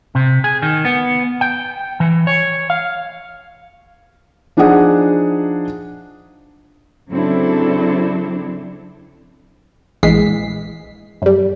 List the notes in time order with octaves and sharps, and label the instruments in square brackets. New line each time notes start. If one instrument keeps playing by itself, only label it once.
[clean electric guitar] C3
G#4
D#3
B3
G5
E3
C#5
F5
[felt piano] F3 D4 D#4 G#4 F#5 D#6
[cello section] C#3 F#3 C4 D4 E4 A4
[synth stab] A#1 E3 G#3 B6 C7
F#2 G3